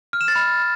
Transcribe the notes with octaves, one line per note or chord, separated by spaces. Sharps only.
F6
E7
A6
B5